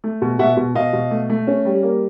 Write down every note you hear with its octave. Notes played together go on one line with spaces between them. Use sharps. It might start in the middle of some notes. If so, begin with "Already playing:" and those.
A3
B2
B2 E5 F#5
B2
B2 D#5 F5
B2
A3
A3
C#4
G3
A#3